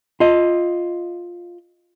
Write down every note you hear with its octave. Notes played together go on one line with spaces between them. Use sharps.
F4 D#5